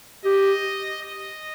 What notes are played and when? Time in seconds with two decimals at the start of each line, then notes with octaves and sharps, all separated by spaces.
0.24 G4 D#5
1.02 D#5